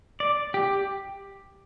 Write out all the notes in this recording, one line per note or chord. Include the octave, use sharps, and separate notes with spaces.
D5
G4